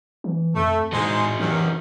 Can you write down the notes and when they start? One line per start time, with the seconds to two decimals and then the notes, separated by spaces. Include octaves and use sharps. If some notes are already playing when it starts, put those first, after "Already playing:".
0.24 E3
0.55 F2 A3
0.92 A2 G#3 D#4 F#4 G#4 C5 D#5
1.39 F#2 C3 D#3 E3